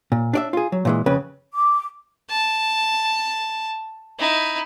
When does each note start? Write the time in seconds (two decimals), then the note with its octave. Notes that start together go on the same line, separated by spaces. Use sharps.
0.12 A#2
0.33 D4 D5 E5
0.53 F4 G#4
0.72 F#3
0.85 A#2 E3 G#3
1.06 F2 C#3 B4
1.53 D6
2.29 A5
4.19 D#4 E4